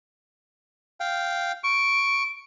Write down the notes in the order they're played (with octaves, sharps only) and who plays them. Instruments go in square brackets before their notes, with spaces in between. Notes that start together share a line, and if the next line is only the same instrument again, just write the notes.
[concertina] F5 G5
[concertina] C#6 [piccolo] D7